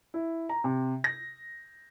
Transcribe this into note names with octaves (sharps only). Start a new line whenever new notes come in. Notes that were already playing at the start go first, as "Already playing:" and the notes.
E4
A#5
C3
A#6